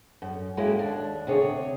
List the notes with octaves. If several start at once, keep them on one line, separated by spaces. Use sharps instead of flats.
F#2
G#3 A#3 C#4 E4 F#4 G4
D#2 D4
D2 C3 G#4 C#5